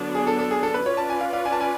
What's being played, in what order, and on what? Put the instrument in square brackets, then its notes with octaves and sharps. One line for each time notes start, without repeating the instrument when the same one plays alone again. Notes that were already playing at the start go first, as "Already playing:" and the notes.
Already playing: [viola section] D3 F#3 B3 D4
[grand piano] G#4
A4
A4
G#4
A4
B4
[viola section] C#4 F4 B4 D5 [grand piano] C#5
[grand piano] A5
G#5
F5
F5
G#5
A5
G#5